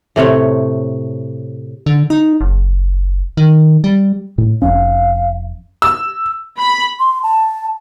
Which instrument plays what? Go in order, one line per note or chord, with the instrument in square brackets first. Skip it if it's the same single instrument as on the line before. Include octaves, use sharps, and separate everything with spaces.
[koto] A2 C3 A3 C#5
[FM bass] D3
D#4
F#1
D#3
G3
[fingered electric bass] A2
[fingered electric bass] F1 F2 C#4 [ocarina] F5
[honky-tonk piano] E6
[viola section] B5
[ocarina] C6
A5